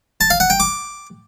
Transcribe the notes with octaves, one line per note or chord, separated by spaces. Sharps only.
A5
F5
F#5
G5
D6